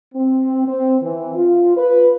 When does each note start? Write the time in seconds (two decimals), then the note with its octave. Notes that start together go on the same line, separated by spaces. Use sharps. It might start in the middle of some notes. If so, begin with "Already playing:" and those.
0.15 C4
0.67 C4
1.02 E3
1.36 F4
1.77 B4